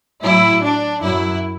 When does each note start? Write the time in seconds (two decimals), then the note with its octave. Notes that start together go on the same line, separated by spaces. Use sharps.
0.23 A2 F#3 E4
0.62 D4
1.02 F#2 F#3 E4